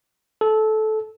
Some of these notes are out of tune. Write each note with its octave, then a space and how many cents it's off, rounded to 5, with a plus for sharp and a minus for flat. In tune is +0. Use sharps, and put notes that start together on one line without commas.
A4 -20